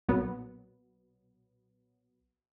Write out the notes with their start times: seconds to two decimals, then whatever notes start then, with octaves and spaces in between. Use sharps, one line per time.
0.08 B1 A#2 F#3 B3